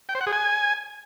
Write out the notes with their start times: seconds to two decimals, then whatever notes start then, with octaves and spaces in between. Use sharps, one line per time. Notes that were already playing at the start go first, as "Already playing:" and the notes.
0.09 G5
0.15 C5
0.21 F#5
0.27 G#4
0.33 G#5